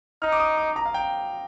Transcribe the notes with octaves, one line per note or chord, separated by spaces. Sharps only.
D#4 F6
D6
D#6
D6
A#5
F5
G5